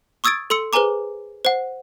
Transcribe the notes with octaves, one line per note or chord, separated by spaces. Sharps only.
C#6 D#6 E6 G#6 A6 D7
A4 C6 E6 C#7
G#4 B4 C5 G#5 A#5 D6
C5 F#5